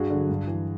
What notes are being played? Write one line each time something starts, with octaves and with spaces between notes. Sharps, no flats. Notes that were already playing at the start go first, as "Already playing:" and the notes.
Already playing: G2 F#4 G#4
D3
F#3
G2
E3